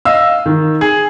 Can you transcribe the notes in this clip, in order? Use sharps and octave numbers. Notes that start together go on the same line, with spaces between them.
D#5 F5 E6
D#3
G#4